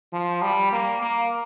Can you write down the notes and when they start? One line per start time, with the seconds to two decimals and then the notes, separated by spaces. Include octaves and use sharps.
0.13 F3
0.42 G3
0.72 A#3
1.02 A#3